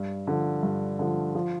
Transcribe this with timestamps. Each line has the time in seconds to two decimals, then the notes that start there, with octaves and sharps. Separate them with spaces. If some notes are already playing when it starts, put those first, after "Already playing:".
Already playing: G2
0.27 D3 F3
0.63 G2
0.99 D3 F3
1.35 F3